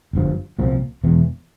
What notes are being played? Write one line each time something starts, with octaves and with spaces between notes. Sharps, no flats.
G1 G2 F3
C2 A#2 F3 C4
E1 E2 E3